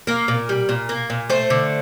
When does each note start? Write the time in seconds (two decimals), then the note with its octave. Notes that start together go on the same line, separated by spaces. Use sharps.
0.07 A#3 A#4
0.28 A#2
0.49 G3
0.69 A#2
0.89 A#3
1.10 A#2
1.29 A3 C5
1.50 D3